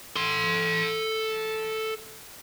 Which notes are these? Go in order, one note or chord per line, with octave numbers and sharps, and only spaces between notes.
A4 C6